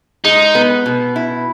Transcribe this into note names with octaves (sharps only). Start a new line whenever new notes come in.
G#3 D#4
B3
B2
E4